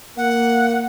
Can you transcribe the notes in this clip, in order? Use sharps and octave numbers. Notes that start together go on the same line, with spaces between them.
A#3 F#5